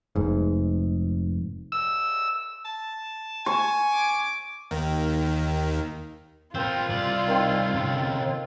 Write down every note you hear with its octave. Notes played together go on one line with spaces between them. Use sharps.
F1 G#2
E6
A5
G#5 C#6
D6
D#2 D#3
C4 F4 A#4 C5
C2 D5
D#3 C4 A4
C3 C#4